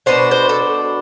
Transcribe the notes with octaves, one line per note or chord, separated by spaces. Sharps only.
B2 B3 D4 C5
C5
A4